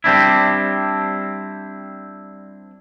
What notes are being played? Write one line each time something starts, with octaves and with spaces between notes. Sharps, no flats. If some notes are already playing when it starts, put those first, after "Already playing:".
G3 C4 D4 E4